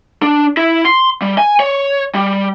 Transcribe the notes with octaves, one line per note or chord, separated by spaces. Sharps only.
D4
E4
C6
G3
G#5
C#5
G3